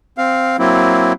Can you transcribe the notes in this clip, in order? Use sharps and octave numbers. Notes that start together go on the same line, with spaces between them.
C4 F5
F#3 A#3 C4 E4